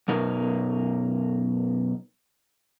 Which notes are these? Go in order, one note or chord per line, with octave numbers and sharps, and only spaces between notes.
F#2 B2 D#4 A#4